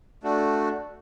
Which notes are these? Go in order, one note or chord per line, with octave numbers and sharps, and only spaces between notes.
A3 D4 F#4